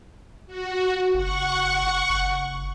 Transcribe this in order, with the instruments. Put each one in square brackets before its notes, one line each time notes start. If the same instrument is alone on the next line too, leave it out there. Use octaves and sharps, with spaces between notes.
[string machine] F#4
[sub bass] F#1 [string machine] F#5 C#6
[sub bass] F#1